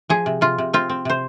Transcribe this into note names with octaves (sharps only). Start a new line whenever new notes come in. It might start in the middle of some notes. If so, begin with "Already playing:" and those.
F3 G#4
C3
C3 F4
C3
C4 F4
C4
C3 C5